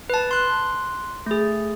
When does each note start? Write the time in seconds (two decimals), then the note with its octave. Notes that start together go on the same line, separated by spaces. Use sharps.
0.10 B4 A5
0.31 C6 F#6
1.26 A3 G#4